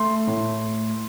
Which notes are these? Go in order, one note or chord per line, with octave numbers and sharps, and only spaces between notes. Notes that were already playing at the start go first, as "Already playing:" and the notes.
Already playing: A3 C6
A2